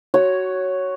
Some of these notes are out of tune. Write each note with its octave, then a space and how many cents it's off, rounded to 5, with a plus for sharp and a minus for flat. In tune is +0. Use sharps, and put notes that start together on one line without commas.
F#4 +15 C#5 +0